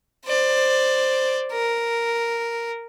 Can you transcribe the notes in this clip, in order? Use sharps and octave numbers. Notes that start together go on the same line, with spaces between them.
C5 D5
A#4